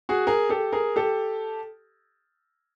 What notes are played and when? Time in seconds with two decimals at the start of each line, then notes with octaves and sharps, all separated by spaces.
0.09 F#4 G#4
0.27 G#4 A#4
0.49 G4 A4
0.73 G#4 A#4
0.96 G4 A4